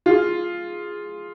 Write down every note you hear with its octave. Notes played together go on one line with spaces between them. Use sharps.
F4 G#4